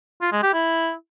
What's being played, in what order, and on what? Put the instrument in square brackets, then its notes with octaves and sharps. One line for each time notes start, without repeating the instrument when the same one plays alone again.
[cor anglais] F4
G#3
G4
E4